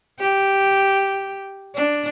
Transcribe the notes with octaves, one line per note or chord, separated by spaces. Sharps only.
G4
D4